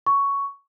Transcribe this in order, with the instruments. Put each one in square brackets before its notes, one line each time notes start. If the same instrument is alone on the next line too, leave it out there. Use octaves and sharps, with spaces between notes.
[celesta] C#6